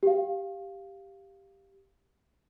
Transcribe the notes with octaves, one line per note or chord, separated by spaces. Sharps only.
G4 F5